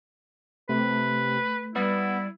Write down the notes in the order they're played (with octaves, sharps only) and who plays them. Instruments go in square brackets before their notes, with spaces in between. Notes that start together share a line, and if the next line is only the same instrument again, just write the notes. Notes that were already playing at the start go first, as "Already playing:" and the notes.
[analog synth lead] C3 [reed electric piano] A3 [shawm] B4
[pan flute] G3 [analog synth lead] B3 [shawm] E4